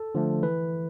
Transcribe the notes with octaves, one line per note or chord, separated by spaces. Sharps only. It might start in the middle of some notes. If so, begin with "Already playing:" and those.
Already playing: A4
D3 F3 A3
E3 B4